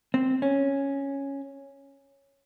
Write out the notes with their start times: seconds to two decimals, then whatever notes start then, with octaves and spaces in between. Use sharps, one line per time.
0.14 C4
0.42 C#4